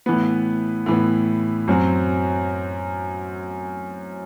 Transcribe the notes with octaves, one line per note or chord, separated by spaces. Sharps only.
A2 E3 B3
A2 E3 B3
F#2 F#3 C4